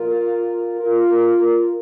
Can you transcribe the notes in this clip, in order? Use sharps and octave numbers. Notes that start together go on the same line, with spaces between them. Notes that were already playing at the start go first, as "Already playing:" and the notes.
Already playing: A#2 F3 A#3 F4 A#4
F4 A#4